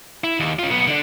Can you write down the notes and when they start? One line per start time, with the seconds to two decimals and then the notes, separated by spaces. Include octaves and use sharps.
0.24 E4
0.40 D#2
0.59 C#4 F4
0.70 B1 B3
0.87 D3 D4